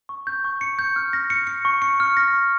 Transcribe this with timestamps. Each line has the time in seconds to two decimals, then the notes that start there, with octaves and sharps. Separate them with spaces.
0.09 C#6
0.27 G6
0.44 C#6
0.61 C#7
0.79 G6
0.96 F6
1.13 A#6
1.30 C#7
1.47 C#7
1.65 C#6
1.82 C#7
2.00 F6
2.17 A#6
2.33 C#6